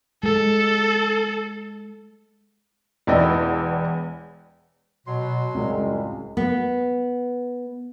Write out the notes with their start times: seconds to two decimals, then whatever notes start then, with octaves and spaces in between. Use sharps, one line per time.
0.23 G#3 A4
3.07 E1 E2 E4 D5 D#5 G5
5.07 B2 F#3 C6
5.55 C#2 F#2 A2 G3 G#3 C4
6.37 B3